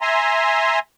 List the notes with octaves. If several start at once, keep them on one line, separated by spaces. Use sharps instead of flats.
E5 G#5 A#5 C6